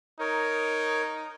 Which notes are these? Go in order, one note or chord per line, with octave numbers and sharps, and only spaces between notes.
D#4 A#4 C#5